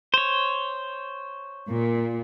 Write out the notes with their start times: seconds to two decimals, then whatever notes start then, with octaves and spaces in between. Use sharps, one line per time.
0.14 C5 C#5
1.69 A#2